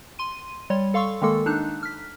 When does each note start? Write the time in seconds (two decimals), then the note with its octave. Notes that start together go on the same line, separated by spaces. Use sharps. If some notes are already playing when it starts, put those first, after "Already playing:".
0.19 C6 D#7
0.70 G3 C#5 C6
0.94 A4 F5 C6 C#6 E6
1.22 D#3 G#3 A#3 A4 E6
1.46 D4 D#4 F#6
1.83 F6 B6